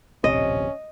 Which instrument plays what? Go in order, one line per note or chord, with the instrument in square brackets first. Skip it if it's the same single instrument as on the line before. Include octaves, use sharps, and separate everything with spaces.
[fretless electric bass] D1 A#1 C3 [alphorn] C#4 [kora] D#5